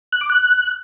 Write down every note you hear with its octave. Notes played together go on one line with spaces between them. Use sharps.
F#6
D6
F#6